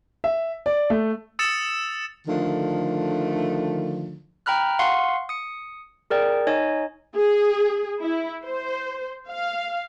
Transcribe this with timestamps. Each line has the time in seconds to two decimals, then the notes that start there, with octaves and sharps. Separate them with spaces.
0.24 E5
0.66 D5
0.90 A3
1.39 D#6 E6 A6 C#7 E7
2.27 D3 D#3 F3 A3
4.46 G5 A#5 B5 F6 F#6
4.79 F5 F#5 C6 C#6
5.29 D#6 C#7
6.10 G#4 A#4 D5 G5
6.47 D#4 C#5 D#5 G#5
7.16 G#4
8.01 E4
8.45 C5
9.30 F5